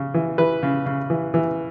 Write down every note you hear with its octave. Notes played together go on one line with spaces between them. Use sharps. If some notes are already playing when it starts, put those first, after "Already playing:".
Already playing: C#3
E3
E3 B4
C#3
C#3
E3
E3